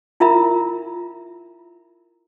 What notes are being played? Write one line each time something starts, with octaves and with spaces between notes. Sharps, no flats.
E4 F4 A#4 E5 A#5 B5